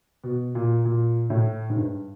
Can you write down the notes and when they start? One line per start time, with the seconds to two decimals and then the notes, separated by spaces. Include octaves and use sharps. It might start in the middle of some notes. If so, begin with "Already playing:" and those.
0.24 B2
0.55 A#2
0.85 A#2
1.30 A2
1.70 G#2
1.76 G2